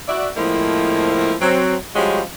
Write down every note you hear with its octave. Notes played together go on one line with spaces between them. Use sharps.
F#4 D5 E5
A2 F3 G#3 A#3 C4 E4
F#3 C4
F3 G3 G#3 C#4 F#4 G4